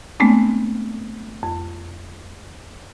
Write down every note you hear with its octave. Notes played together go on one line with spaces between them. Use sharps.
G#3 A3 B3 C4 D4
F2